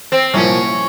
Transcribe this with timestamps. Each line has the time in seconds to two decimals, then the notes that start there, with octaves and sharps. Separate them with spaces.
0.12 C4
0.34 C2 A#2 F3 C#4